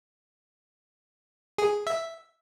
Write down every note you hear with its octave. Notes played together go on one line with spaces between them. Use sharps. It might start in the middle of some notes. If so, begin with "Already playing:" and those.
G#4
E5